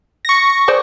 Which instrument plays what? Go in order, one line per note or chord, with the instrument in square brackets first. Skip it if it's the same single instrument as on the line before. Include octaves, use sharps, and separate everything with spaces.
[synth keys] C#6 A#6
[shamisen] G#4 C5 D5